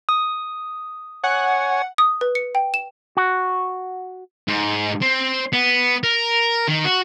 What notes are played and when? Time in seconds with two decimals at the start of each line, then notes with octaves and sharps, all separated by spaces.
0.09 D#6
1.24 C#5 F#5 G#5
1.98 D#6
2.21 B4
2.35 C#7
2.55 G5
2.74 E7
3.17 F#4
4.48 G#2
5.02 C4
5.53 B3
6.04 A#4
6.69 D#3
6.85 F#4